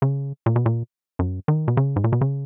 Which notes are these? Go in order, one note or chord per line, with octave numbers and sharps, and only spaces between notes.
C#3
A#2
B2
A#2
F#2
D#3
B2
C#3
G#2
A#2
B2
C#3